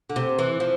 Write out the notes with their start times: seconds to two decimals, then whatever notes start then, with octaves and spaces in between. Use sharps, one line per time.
0.10 D3
0.16 C3
0.39 E3
0.60 F3